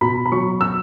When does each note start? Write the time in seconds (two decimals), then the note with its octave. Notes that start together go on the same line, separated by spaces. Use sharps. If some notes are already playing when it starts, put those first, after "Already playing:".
0.01 B2 B5
0.26 B5
0.32 F#3 C#6
0.61 E6